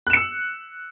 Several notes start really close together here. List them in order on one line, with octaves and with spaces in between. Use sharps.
F#6 E7 C#7 E6